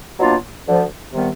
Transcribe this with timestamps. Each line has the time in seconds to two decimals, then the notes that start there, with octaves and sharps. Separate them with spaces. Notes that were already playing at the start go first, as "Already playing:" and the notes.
0.18 B2 F#3 A#3 D4 F4
0.66 D2 D3 F3
1.13 C3 D#3 G3 B3